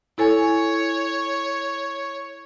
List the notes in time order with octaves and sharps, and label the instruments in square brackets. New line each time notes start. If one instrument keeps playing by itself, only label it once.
[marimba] E4 A4 G#5 [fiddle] C#5